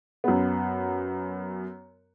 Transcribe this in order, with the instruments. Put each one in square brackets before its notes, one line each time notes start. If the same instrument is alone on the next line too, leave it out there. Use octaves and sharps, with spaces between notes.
[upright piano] F#2 B3